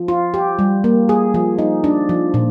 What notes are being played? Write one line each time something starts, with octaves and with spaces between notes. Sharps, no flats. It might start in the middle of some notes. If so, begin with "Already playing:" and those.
Already playing: F3
F4
G4
G3
A#3
G#4
F3
D#4
D4
F3
A#2